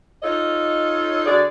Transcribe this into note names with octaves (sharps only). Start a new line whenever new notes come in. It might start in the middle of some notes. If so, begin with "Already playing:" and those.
D#4 F4 A4 C#5 D#5
D3 F#4 G#4 D5